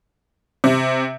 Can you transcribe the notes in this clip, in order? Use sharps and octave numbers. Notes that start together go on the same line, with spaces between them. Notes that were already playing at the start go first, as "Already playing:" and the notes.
C3